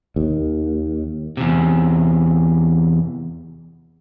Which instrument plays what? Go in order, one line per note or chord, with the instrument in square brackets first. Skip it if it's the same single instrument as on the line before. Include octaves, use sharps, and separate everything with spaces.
[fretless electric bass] D#2
[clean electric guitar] E2 C3